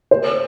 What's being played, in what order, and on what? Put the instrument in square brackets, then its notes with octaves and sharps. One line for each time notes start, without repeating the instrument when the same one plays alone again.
[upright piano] C5